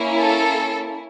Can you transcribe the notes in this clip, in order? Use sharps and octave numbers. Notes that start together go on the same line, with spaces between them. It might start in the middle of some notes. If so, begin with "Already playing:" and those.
Already playing: A#3 C#4 E4
A4